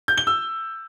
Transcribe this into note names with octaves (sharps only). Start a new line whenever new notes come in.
G6
G7
E6